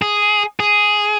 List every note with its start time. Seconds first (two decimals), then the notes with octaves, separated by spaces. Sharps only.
0.02 G#4
0.60 G#4